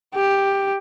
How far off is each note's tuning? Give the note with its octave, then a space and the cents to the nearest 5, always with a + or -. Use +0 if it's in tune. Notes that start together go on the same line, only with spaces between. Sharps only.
G4 +10